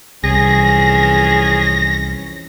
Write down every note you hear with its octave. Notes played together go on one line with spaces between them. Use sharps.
C2 F2 E3 C#4 G#4 A#6